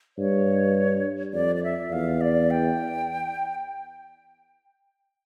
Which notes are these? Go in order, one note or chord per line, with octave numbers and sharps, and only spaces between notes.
G2 C#5
F2 D5
D5
E5
E2 F5
D5
G5